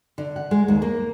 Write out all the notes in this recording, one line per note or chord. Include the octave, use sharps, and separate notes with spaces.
D3
F#5
G#3
D#2
A#3